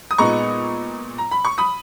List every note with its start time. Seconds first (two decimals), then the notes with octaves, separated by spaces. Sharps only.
0.11 D#6
0.18 A#2 G#3 B3 D#4 A#5 C#6
1.18 A#5
1.31 B5
1.45 C#6
1.58 B5 D#6